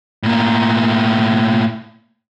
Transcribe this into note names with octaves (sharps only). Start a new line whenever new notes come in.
A2 A#3